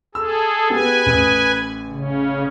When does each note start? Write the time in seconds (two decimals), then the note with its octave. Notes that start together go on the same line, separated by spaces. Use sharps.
0.15 G#4 A4 E6
0.70 B3 G4 G#4 B4 G#5
1.06 A1 D#6
1.89 C#3 C#4